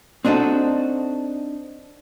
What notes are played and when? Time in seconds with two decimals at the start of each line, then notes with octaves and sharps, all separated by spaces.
0.25 C4 D4 D#4 F#4 A4